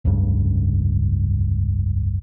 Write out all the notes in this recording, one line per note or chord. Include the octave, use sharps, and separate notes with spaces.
F1 C#2 G2 C#3